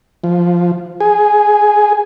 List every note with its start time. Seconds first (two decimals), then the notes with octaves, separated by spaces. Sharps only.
0.24 F3
1.00 G#4